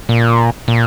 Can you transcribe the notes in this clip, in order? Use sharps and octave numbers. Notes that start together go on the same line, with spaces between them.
A#2
A#2